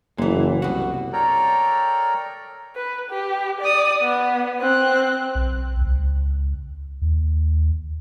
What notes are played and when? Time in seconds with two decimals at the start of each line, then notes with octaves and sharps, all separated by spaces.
0.18 F#1 A#2 E3
0.62 C2 B2 F#4
1.13 A4 A#4 C#5 D5 G5 A#5
2.75 B4
3.10 G4
3.61 D5 D#6
4.01 B3
4.61 C4 F#6
5.35 B1
5.81 C#2
7.02 D#2